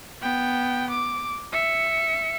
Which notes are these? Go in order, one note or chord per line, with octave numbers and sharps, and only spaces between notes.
B3 G5
D6
E5 C#7